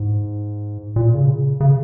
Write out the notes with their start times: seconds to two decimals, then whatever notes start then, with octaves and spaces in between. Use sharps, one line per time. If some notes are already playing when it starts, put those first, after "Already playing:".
Already playing: G#2
0.96 A#2
1.15 C#3
1.60 C#3